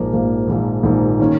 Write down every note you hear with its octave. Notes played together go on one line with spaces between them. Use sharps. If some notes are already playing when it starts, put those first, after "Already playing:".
Already playing: A#1 G#2 F3 A#3
A#1 G#2 F3 A#3
A#1 G#2 F3 A#3
A#1 G#2 F3 A#3
D#3 A#3 C#4